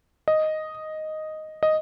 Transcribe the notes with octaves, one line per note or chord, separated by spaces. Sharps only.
D#5
D#5